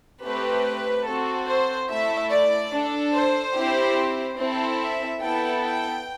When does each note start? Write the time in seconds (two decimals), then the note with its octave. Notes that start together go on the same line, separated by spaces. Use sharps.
0.24 A3 C4 G4 B4
1.07 C4 F#4 A4
1.48 C5
1.90 A3 E4 A4 E5
2.31 D5
2.72 D4 A4
3.14 C5
3.55 C4 E4 G4
4.38 C4 E4 A4
4.79 E5
5.21 B3 E4 A4 G5
5.62 G5